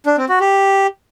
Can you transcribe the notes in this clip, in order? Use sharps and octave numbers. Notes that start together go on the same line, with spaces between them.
D4
C4
F#4
G4